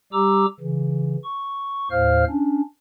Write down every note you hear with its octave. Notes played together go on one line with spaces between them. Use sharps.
G3 G4 A#5 D6 E6
C#3 E3
C#6
D#2 A2 C5 F5 F6
C#4 D4